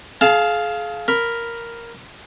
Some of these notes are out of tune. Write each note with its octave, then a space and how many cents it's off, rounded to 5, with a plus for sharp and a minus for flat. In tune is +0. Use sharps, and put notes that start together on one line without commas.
G#4 +35 F5 +0 A5 +0
A#4 +0 B5 +0